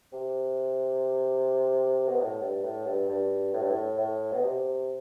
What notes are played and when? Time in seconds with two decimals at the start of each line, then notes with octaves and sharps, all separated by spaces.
0.13 C3
2.08 B2
2.21 A2
2.42 G2
2.64 A2
2.86 G2
3.09 G2
3.53 A2
3.62 G2
3.69 A2
3.98 A2
4.32 B2
4.43 C3